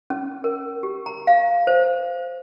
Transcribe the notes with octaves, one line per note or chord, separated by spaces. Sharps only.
C#4
A#4
G4
A#5
F5
C5